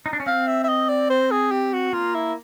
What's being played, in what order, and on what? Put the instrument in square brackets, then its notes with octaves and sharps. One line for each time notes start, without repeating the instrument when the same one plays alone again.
[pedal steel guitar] D#4
D4
C#4
[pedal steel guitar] C4 [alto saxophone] F5
[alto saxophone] E5
E5
D#5
D5
C5
G#4
G4
F#4
[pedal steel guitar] A#3 [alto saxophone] F4
[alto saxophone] E4